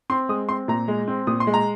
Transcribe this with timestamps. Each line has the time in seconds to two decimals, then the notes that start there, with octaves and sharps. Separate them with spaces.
0.10 C4 C6
0.29 G#3 D#6
0.49 C4 C6
0.68 A#2 A#5
0.88 G#3
1.08 C4
1.27 A#2 D#6
1.40 C6
1.47 G#3
1.54 A#5